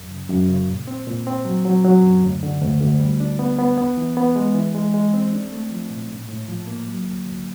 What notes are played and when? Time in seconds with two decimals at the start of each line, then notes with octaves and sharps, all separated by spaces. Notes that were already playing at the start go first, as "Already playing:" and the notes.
Already playing: F#2
0.11 C#3
0.30 F#2
0.49 C#3
0.68 A#2
0.87 C4
1.07 A#2
1.27 C4
1.45 F#3
1.65 F#3
1.85 F#3
2.03 F#2
2.24 D2
2.43 D3
2.61 D2
2.81 D2
3.00 G3
3.20 D4
3.39 B3
3.59 B3
3.77 B3
3.97 E3
4.17 B3
4.36 G#3
4.54 E3
4.75 G#3
4.94 G#3
5.14 C4
5.33 D4
5.52 A3
5.71 F3
5.90 A#2
6.10 A2
6.29 A2
6.48 F3
6.67 A#3
6.87 F#3
7.07 D2
7.26 D2